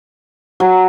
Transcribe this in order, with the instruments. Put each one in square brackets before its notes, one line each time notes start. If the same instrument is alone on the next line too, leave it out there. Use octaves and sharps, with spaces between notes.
[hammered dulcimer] F#3